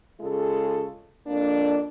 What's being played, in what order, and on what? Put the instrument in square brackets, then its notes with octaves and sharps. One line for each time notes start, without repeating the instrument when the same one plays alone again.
[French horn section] C#3 G#3 F4 A4
F2 A#3 D4